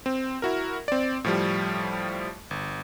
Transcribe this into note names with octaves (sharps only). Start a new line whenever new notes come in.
C4
E4 F#4 A#4
C4 D5
A2 F3 G3
G1